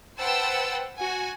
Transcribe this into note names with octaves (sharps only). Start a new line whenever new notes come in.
B4 C5 F#5 G5 A5 E6
F#4 G#5